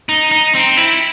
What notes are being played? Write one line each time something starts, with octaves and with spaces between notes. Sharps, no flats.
D#4
D#4
C4
E4